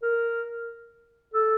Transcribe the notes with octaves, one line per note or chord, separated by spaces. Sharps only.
A#4
A4